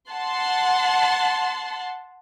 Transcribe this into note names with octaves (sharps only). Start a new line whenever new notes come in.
F#5 A5 C6